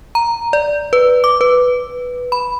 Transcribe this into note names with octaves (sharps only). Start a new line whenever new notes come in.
A#5
D5
B4
D6
B4
B5